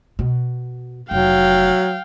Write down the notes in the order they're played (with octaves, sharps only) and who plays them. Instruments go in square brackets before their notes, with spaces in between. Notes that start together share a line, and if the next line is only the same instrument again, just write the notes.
[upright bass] B2
[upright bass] F1 [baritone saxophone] F#3 [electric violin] F5 G5